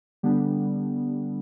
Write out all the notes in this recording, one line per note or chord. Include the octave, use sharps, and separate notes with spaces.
D3 G3 B3 D4